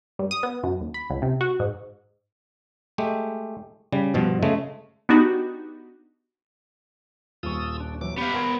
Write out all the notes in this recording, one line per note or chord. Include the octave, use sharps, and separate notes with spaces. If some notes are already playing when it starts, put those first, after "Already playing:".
G2
D#6
B3
F#2
D#2
B5
C#2
C3
F#4
G#2
G#3 A3 G4
C#3 G3
G2 B2 F3
C#3 G#3 A3
B3 D4 D#4 F#4 G4
D#1 F4 C#6 D#6 E6
D4
E3 F#3 D6
B3 G4 B4 F5
A#4 F#5 C6 G#6